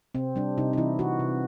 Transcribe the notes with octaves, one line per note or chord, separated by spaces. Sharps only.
C3 C4
G3 D4
C3 D#4
D#4
E3 E4
E3 F#4
C3